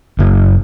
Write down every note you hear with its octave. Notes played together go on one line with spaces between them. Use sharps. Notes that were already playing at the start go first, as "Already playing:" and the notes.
F#1